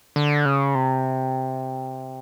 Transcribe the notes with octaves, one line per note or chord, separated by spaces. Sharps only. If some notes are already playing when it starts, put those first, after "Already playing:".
D3
C#3
C3